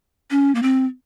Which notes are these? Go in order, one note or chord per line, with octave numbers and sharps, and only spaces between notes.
C#4
A#3
C4